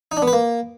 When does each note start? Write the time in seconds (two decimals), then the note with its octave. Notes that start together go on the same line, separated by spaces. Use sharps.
0.12 D#4
0.17 D4
0.22 B3
0.28 B4
0.33 A#3